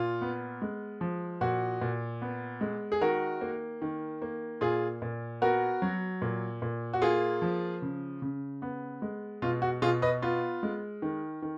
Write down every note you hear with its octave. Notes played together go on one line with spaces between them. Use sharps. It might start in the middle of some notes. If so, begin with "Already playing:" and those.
Already playing: A#2 F4
B3
G#3
F3
A#2 F#4
A#2
B3
G#3
G#4
D#3 F#4 A#4
A#3
D#3
A#3
A#2 F4 G#4
A#2
B3 F#4 A#4
F#3
A#2
A#2
F#4
A#3 F4 G#4
F3
C#3
C#3
B3
G#3
B2 F4
F#4
B2 F4 G#4
B4 D#5
B3 F4
G#3
D#3
D#3